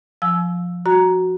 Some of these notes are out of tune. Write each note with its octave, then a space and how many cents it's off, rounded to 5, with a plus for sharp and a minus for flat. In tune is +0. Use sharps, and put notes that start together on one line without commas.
F3 +15 G#5 +45 E6 +0
F#4 +0 A#5 +5